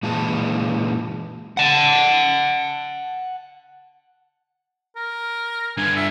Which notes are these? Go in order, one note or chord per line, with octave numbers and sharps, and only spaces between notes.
A#2 E3 G#3 A5
F#5 A5
A#4
G2 D3 G#5
E5